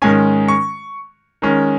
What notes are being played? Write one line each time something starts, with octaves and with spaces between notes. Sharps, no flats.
G#2 D#3 G#3 C#4 G#5
C#6
D#3 G#3 C#4